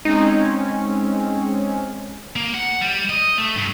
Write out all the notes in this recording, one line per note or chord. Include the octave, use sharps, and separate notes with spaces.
G#3 C4 C#4 D#4
A#3
F#5
G3
D#5
A3
G2